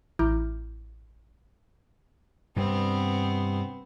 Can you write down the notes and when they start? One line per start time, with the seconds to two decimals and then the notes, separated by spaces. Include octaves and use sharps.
0.19 A1 E4 A#5 D6 F6 G6
2.56 G2 C3 G3 B3 C4